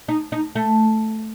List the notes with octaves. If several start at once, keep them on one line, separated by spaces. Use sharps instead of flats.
D#4
D#4
A3